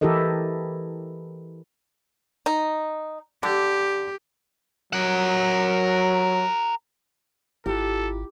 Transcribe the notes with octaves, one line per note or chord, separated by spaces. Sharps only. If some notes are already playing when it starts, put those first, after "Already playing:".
E3 E4 G4 A4 A#4 D#5
D#4
D3 G4
F#3 A#4 F#5
G#1 E4 F4 G4 A4